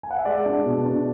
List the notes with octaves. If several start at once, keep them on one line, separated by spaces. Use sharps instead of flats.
G#5
F#5
E5
G#3 D5
D4
B2
D4